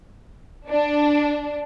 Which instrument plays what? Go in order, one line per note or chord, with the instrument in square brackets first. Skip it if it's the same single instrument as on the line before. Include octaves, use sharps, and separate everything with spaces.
[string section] D4